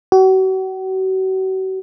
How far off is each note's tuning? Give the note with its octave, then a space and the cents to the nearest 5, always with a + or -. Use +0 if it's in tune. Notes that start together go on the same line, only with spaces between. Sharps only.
F#4 +40